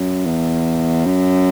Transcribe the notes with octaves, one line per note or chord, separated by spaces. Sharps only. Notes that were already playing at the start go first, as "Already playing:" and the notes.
Already playing: F#2
E2
F#2